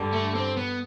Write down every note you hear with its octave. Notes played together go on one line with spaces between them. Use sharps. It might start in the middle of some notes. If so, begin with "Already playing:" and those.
Already playing: G2 D3 G3
A3
C4
B3